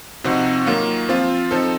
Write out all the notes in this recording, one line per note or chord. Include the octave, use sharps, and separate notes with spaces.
C3 F3 C4 D#4 F#4
D#3 F#3 A#3 F4
F3 C4 F4
F3 C4 D#4 A4